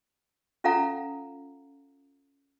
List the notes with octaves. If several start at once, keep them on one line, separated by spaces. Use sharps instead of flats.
C#4 F4 A4 F5 F#5 A#5